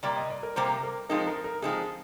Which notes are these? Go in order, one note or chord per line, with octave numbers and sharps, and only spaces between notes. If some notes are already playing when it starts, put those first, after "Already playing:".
C3 G3 A#3 D5
D#5
D5
A#4
C3 G3 A#3 C5
A#4
F3 G#3 C4 D#4 A#4
A#4
A#4
F3 G#3 C4 D#4 G#4